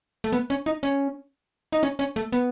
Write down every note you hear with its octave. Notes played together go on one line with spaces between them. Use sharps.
A3
B3
C#4
D#4
C#4
D#4
C#4
C#4
A3
B3